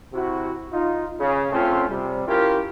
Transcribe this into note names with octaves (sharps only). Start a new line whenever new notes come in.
C3 E4 F#4
D#4 F4
C#3
C#3 A3 C4 C#4 F4
C3 G3
C#4 E4 F4 G4 A#4